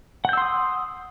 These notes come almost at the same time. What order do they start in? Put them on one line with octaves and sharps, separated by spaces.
F#5 G6 E6 C6 D#6